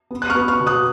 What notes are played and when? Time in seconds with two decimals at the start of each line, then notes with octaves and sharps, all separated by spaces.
0.11 B3
0.22 F#6
0.29 C#6 F6
0.36 B3
0.48 C#6 F6
0.60 B2
0.67 D#6 F#6